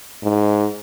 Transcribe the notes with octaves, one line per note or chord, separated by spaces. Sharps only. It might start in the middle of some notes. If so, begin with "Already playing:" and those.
G#2